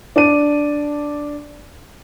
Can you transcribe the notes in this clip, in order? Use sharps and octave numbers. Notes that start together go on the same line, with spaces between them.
D4 D5 D#7